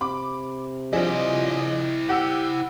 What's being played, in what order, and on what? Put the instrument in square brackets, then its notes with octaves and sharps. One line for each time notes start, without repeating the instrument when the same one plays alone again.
[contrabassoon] C3 [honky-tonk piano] B5 D6
[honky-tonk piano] F3 D4 G#4 [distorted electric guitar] E4 C5 [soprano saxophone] D#5
[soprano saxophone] G4 [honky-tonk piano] F#5 E6 C#7